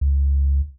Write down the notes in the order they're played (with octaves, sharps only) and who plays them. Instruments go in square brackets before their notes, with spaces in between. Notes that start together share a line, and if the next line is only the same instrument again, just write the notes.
[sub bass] C#2